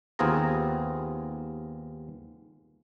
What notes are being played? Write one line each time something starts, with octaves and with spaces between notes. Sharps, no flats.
D#2 B3 C4 F4 G#4 A#5